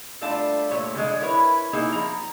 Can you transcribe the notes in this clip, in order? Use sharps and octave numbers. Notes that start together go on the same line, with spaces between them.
G3 A3 D4 F4 A5
A#2 A3 C#5
D3 F3 G#3
E4 A#4 B4 C#5
A#3 D#4 E4 G#4
F3 A#5